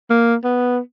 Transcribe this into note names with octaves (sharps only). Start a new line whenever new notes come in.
A#3
B3